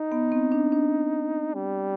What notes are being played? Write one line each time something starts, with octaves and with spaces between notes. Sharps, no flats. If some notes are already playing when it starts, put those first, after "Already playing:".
Already playing: D#4
B3
C4
D4
D4
G3